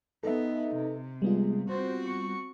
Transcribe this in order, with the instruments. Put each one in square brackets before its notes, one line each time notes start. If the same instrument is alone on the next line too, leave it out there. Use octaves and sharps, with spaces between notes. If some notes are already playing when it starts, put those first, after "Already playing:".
[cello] B3 [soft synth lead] D#4 [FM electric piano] A4 B4 E5
[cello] C3
[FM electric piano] G3 B3 F4 [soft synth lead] G#3
[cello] C4 F#4 [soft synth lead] C5
[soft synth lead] C#6